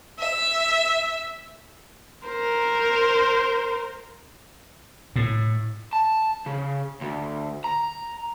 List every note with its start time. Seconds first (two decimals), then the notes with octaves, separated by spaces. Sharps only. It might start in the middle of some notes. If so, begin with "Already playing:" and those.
0.19 E5
2.27 A#4 C5
5.16 A2
5.93 A5
6.46 C#3
7.01 D2
7.64 A#5